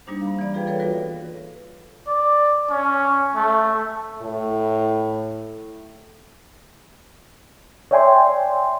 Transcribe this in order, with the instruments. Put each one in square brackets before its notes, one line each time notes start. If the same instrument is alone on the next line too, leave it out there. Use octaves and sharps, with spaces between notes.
[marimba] G3 A#3 D4 D#4 G4 C5
F5 B5
E3 D5
F4 G#4 B4 F5 G5
F4 A4 B4 C#5
E3 B3 F4 F#4 B4 A#6
[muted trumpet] D5
C#4
A3
[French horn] A2
[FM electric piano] C#5 D5 E5 G5 G#5 C6